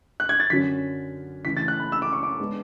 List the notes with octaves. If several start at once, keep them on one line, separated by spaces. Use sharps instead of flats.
F#6
G#6
A6
F#2 D3 F#3 C#4 B6
C#3 E3 A3 B6
A6
F#6
B5
E6
D6
C#6
D6
G#3 B3 D4